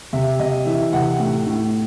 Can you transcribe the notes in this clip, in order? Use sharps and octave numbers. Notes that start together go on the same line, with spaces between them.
C3 E5
C3 D#5
E3 E5
C3 F#5
A2
A2